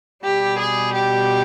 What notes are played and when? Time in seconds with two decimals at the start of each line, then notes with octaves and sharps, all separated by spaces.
0.24 B2 G3 G4
0.58 G#4
0.93 G4